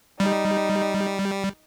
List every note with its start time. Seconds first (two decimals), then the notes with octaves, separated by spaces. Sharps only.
0.20 G3 D#4